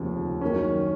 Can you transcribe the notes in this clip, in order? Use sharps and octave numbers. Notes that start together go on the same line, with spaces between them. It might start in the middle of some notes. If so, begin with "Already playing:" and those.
Already playing: F1 D#2 C#3 F3
F#2 D#3 A#3 C#4